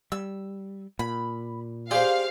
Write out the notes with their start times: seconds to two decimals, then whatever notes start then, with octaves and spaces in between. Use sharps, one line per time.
0.12 G3 E6
0.99 A#2 B5
1.91 G4 G#4 C5 D5 F5 C6